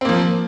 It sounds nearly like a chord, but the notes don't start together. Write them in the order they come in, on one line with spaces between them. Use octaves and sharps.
C4 A#3 F3